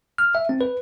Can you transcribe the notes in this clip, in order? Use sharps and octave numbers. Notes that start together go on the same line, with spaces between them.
F6
E5
C4
B4